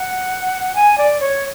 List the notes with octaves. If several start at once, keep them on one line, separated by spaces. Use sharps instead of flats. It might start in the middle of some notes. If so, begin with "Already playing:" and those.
Already playing: F#5
G#5
D5
C#5